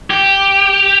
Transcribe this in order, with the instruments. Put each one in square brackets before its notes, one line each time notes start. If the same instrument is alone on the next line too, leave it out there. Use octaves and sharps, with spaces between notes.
[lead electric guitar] G4